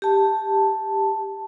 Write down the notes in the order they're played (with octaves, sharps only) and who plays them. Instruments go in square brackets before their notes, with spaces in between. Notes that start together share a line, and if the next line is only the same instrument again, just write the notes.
[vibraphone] G4 A5